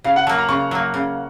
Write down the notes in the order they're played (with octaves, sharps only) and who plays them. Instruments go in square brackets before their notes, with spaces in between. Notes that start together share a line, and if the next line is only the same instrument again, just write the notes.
[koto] C#3 [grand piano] F5
[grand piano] F#5
[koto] F#3 A#3 [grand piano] A5
[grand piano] A#5
[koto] C#3 [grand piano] C#6
[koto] F#3 A#3
C#3